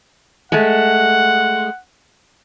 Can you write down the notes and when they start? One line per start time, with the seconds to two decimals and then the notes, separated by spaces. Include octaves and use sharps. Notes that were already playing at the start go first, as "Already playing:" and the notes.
0.52 G#3 A3 F#5